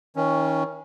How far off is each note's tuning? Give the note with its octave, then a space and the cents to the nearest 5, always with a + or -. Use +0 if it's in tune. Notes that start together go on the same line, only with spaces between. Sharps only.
D#3 +35 C#4 +0